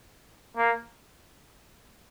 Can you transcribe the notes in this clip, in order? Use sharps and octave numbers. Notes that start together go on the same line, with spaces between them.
A#3